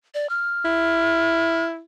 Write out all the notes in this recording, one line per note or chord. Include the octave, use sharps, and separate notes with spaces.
D5
F6
E4